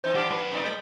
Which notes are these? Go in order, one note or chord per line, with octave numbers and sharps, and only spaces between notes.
E3 C4 D#4 C5 G6
G2 E3 D4 G4 F#5 D6 F6
F#2 B4
B2 D#4 D5
G3 G#3 D#5 G6